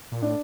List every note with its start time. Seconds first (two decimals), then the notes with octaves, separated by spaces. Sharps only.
0.12 A#2
0.22 A2 D4